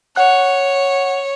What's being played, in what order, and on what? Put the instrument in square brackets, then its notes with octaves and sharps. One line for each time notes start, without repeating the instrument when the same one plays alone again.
[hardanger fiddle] C#5 [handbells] F#5 F#6